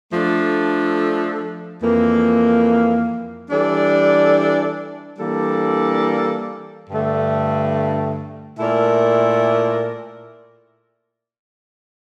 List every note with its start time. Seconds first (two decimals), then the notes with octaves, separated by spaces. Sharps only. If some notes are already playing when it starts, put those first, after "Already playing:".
0.12 F3 A3 D4 A4
1.81 F2 E3 A#3
3.50 E3 G3 D4 A4 D5
5.19 E3 G3 A#3 D4 A4
6.89 G2 D3 A3
8.58 A#2 A3 E4 A#4 D5